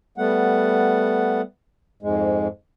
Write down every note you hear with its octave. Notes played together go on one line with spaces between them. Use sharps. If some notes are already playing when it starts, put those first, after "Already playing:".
G3 A3 B3 F#5
F2 G#2 G#3